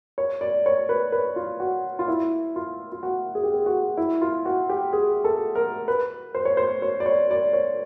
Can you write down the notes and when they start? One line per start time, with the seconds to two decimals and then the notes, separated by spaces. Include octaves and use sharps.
0.18 C#5
0.41 D5
0.66 C#5
0.89 B4
1.12 B4
1.36 F4
1.60 F#4
1.99 F4
2.08 E4
2.56 F4
2.92 F4
3.03 F#4
3.35 G#4
3.43 G4
3.54 G#4
3.66 F#4
3.97 E4
4.22 F4
4.45 F#4
4.70 G4
4.93 G#4
5.24 A4
5.55 A#4
5.88 B4
6.35 C5
6.45 C#5
6.57 C5
6.82 C#5
7.00 D5
7.06 C#5
7.31 D5
7.53 C#5